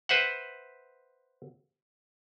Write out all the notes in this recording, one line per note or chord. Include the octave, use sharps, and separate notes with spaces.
B4 C5 E5 F#5